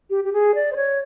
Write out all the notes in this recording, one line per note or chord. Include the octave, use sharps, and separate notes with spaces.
G4
G4
G#4
D5
C5
C#5